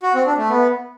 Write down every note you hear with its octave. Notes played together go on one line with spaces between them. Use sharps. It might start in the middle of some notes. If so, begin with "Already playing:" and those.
F#4
C4
D4
A3
B3